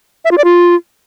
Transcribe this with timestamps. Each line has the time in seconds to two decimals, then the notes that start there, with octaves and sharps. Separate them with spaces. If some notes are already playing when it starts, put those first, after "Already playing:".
0.25 E5
0.31 F4
0.38 D5
0.44 F4